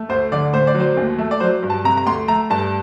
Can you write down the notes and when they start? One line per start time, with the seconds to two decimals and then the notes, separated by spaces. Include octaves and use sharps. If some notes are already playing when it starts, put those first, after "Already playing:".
Already playing: A3
0.09 D2 C5
0.32 D3 D5
0.53 A2 C5
0.67 D5
0.75 F#3
0.80 C5
0.97 D#2
1.19 A3
1.31 D5
1.40 F#3 C5
1.63 G2
1.70 A5
1.84 C3 A#5
1.97 A#5
2.06 D2 C6
2.28 A3 A#5
2.50 G2 A5